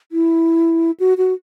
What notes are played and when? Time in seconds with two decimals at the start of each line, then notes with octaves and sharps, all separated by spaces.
0.12 E4
1.00 F#4
1.18 F#4